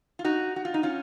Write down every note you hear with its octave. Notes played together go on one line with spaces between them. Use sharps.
F4
D#4 F#4
F#4
F4
D#4
C#4 F4